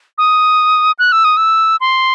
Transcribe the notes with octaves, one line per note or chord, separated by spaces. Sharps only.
D#6
F#6
E6
D#6
E6
C6